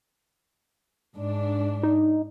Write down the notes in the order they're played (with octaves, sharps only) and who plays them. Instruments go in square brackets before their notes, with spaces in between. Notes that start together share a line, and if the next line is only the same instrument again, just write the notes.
[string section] G#2 D4
[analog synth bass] D#4